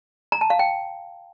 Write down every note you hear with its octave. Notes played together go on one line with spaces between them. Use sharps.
A#5
A5
F5
G5